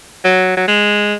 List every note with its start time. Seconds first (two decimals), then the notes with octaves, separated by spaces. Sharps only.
0.24 F#3
0.57 F#3
0.68 G#3